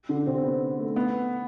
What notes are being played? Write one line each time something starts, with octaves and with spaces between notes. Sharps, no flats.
D3 D4
C3 C4
B3
B3
A3
B3